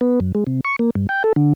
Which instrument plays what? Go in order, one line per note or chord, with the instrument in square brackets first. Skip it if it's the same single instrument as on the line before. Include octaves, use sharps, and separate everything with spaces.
[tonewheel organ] B3
F#2
G#3
C3
C#6
A#3
G2
G5
A4
D3